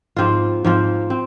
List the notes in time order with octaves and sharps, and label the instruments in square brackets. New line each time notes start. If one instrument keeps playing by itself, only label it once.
[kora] G#2 F3 C4 F4
G#2 F3 C4 F4
C4